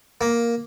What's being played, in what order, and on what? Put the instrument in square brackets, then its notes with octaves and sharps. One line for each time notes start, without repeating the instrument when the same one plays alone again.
[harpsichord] A#3